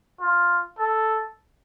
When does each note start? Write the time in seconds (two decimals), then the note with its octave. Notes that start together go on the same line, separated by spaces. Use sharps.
0.20 F4
0.78 A4